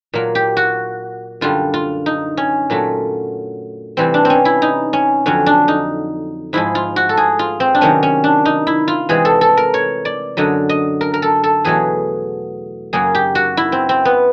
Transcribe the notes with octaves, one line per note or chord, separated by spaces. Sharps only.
A#2 F#3 A#3
G4
F#4
F#2 D3 G3 F4
F4
D#4
C#4
A#2 F#3 A3
C3 E3 G3 C4
D4
C4
C#4
E4
D#4
C#4
F2 D3 F#3 C#4
D4
D#4
G#2 F3 G#3 E4
F4
F#4
A4
G#4
F4
C4
D4
C3 D#3 F#3 C#4
C#4
D4
D#4
E4
F4
C3 E3 G#3 G#4
A4
A4
A#4
C#5
D5
F#2 D3 F#3 D#5
D#5
A#4
A#4
A4
A4
E2 B2 F#3 A3 G#4
F#2 C#3 F#3 A#3 G#4
G4
F#4
E4
C4
C4
B3